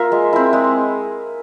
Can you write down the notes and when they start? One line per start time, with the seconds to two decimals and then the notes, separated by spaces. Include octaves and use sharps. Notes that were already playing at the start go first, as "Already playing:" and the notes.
Already playing: A#3 F4 A#4 E5
0.12 G#3
0.33 C4 E4
0.53 G#3